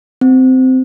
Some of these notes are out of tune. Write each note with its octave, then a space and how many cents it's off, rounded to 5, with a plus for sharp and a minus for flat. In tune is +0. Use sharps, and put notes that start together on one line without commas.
C4 -15